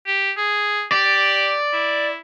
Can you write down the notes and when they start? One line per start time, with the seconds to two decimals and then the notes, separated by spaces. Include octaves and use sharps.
0.07 G4
0.37 G#4
0.92 G4 D5
1.73 E4